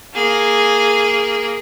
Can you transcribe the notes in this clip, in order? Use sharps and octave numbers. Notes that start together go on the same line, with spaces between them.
A#3 G#4